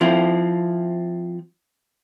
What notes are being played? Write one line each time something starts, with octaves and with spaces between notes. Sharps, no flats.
F3 C4 E4